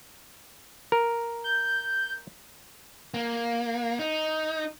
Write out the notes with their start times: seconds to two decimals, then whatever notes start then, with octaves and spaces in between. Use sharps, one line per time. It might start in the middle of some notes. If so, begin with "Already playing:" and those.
0.92 A#4
1.44 G6
3.14 A#3
3.99 D#4